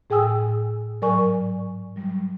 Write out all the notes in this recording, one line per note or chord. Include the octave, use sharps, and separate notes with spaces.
A2 G#4 G5 G#5 D#6 E6
G#2 F#3 A#4 D5 G#5 C#6
F#3 G3